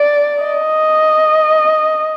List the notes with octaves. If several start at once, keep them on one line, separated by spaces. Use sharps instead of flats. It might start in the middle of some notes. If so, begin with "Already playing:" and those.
Already playing: D5
D#5